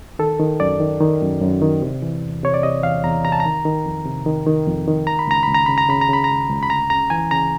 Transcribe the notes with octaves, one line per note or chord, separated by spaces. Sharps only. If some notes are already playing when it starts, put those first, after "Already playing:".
D#3 A4
D#3
F#2 D5
D#3
D#3
F#2
F#2
D#3
C3
E3
E2
C3 C#5
D5
C3 D#5
E2 F5
E2 A#5
C3 A#5
A5
A#5
D#3
D#3
F2
C3
D#3
D#3
F2
D#3
C#2 A#5
B5
C#2 A#5
C#2 B5
A#5
C#3 B5
A#5
C#3 B5
A#5
C#3 B5
C#2 A#5
C#2
B5
D2 A#5
C#3 A#5
E3 G#5
C#3 A#5